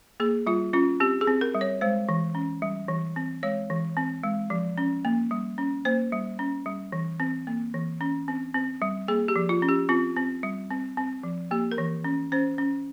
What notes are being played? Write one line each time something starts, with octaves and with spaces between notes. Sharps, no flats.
A#3 G#4
G3 F4
C#4 F4
C4 G4
G#4
C4
A#4
G3
C#5
G#3 C5
E3
C#4
G3
E3
C4
G#3 C#5
E3
C4
G#3
F3
C#4
A#3
G3
C#4
A#3 C5
G3
C#4
G3
E3
C4
A#3
E3
C#4
C4
C4
G3
A#3 G#4
G4
F3
F4
C#4
G4
C4 F4
C4
G3
C4
C4
F3
A#3 G4
A#4
E3
C#4
C#4 C5
C#4